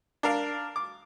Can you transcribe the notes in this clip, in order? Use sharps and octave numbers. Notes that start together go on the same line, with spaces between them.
D4 A#4 F5
D6